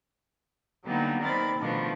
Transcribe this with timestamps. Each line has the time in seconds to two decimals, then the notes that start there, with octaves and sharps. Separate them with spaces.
0.85 D3 F#3 G3 A#3 B3 D#4
1.22 D#3 C4 A#4 D5 B5 A6
1.59 B2 D#3 F3 A3 B3 D4